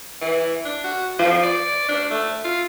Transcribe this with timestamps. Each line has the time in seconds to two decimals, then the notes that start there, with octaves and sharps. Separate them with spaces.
0.22 E3
0.65 D4
0.84 F#4
1.19 F3
1.43 D5
1.89 D4
2.11 A3
2.44 F4